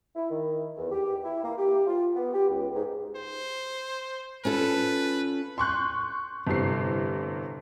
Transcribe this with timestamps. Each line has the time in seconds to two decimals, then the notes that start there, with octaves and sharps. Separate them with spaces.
0.16 E4
0.30 D#3
0.77 E2
0.92 G4
1.24 E4
1.44 A#3
1.58 G4
1.87 F4
2.16 B3
2.34 G4
2.49 C#2
2.75 G#2
3.17 C5
4.45 C#4 F4 A4 B4
5.58 C6 C#6 F#6 G6
6.47 G1 A2 C3 C7